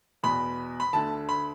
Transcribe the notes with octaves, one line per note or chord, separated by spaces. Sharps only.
E2 B2 B5
B5
D2 D3 A5
B5